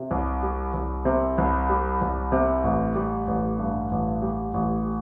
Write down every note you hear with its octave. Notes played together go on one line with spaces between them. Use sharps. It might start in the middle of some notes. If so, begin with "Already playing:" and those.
Already playing: C3
C2
G3
C2
C3
C2
G3
C2
C3
A1
G3
A1
G2
A1
G3
A1